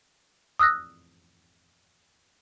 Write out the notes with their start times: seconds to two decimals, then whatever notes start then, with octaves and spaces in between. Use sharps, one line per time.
0.59 D#6 E6 F#6 A#6